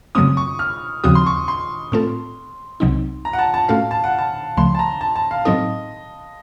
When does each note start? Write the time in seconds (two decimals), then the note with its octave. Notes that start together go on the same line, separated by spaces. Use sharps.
0.15 F#2 C#3 F#3 A3 C4 D#6
0.37 C#6
0.59 F6
1.04 D#2 C#3 F3 C4 F#4 D#6
1.15 C6
1.26 C#6
1.48 C6
1.92 A2 A3 C4 F4 A4
2.80 C2 C3 F#3 C4 D#4
3.25 A#5
3.33 F#5
3.39 A5
3.54 A5
3.68 A2 A3 C#4 F#4 A4 F5
3.91 A5
4.04 F#5
4.18 A5
4.57 C#2 C#3 F3 A3 C6
4.75 A5
4.79 A#5
5.01 A5
5.16 A5
5.31 F5
5.45 A2 F#3 C4 D#4 A4 D#5